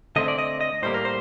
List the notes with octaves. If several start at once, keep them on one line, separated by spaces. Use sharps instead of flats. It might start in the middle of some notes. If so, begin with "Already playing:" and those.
D3 A3 C4 D#5
D5
D#5
D#5
A2 G3 A#3 C5
A#4
C5